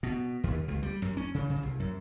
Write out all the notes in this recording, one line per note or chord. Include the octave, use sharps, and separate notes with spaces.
B2
D#2
C#2
G3
F#2
C#4
C#3
C#3
C2
F#2